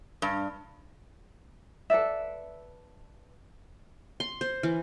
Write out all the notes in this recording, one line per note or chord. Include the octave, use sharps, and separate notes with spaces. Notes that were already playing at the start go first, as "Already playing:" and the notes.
G2
A4 B4 D5 E5
C6
C5
E3